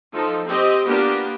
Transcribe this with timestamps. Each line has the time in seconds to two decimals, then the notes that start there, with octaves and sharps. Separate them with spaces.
0.13 F3 D#4 A4
0.46 C4 G4 D#5
0.87 A#3 B3 D4 F4 G4 A#4